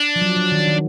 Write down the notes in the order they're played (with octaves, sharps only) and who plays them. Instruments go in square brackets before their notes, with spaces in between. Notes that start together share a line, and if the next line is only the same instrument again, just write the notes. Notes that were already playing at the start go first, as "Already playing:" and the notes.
Already playing: [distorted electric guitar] D4
[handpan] F3
F#3
F#3
D#3
D#3